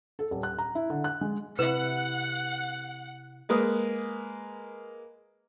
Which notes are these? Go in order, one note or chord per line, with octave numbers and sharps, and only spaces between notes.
A4
D#1
F#6
A#5
E4
D3
F#6
G#3
C3 E4 B4 F#5
G#3 A#3 B4 D#6